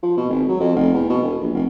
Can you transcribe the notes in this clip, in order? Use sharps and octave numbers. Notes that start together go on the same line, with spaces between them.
F3
B2
G#1
F#3
F2
F1
E2
B2
E1
A#1
F1